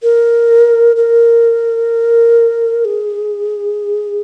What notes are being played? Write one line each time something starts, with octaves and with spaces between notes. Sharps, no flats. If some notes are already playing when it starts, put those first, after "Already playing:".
A#4
A#4
G#4